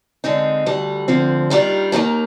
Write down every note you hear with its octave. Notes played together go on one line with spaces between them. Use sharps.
D3 G#3 C4 D#4
D2 D3 G3
D2 D3 F3 C4
D#2 D#3 G3 D4 F4
D#2 D#3 G3 A#3